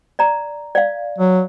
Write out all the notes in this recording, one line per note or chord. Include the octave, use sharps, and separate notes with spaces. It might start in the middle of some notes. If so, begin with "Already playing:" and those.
D5 A#5
D5 F5
F#3